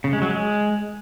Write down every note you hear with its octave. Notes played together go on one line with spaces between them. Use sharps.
C#3
G#3
F#3
G#3